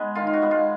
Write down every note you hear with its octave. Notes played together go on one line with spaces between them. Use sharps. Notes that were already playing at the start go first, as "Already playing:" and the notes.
Already playing: G#3 B3
D#3 F4
F4
F#4
G#3 B3
F4